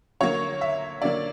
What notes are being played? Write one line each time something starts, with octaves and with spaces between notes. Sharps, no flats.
D3 F#3 A#3 C#5
E5
D3 F#3 A#3 D5